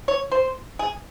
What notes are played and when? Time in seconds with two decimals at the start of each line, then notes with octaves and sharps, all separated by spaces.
0.08 C#5
0.32 C5
0.79 G#4